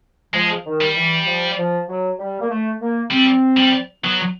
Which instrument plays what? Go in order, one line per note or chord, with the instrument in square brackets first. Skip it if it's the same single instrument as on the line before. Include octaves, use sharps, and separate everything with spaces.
[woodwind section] F3 [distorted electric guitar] G#3
[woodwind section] D#3
[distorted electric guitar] G3
[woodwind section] E3
F3
F3
F#3
G3
A#3
A3
A#3
[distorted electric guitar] G3 [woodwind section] C4
[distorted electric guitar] G3
[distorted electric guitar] F#3 [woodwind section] B3